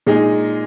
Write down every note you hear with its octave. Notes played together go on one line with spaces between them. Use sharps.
A#2 G#3 D#4 G#4